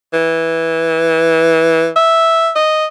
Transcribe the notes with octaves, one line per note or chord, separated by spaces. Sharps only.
E3
E5
D#5